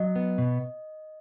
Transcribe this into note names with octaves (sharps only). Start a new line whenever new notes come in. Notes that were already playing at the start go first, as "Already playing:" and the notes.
Already playing: F#3 D#5
B3
B2